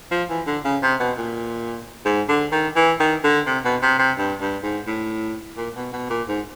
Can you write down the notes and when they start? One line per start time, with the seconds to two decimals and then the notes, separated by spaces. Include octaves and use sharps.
0.11 F3
0.29 E3
0.47 D3
0.65 C#3
0.82 C3
1.00 B2
1.17 A#2
2.05 G#2
2.29 D3
2.52 D#3
2.76 E3
3.00 D#3
3.23 D3
3.46 C3
3.65 B2
3.82 C3
3.99 C3
4.17 G2
4.41 G2
4.63 G#2
4.87 A2
5.57 A#2
5.76 B2
5.93 B2
6.10 A#2
6.28 G#2